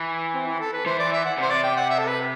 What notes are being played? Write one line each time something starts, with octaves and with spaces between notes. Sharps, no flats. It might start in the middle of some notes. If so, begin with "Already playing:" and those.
Already playing: E3
C4
E4
A4
B4
E3 C5
D5
E5
F#5
C3 C5
D5
G5
F#5
E5
A4
B4